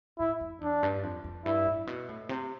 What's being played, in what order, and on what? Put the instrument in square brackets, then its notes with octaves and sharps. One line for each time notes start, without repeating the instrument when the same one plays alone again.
[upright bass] A2 [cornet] E4
[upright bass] F2
[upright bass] E2 [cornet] D4
[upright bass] G2
F2
F2
[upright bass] G2 [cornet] E4
[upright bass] A2
B2
A2
C3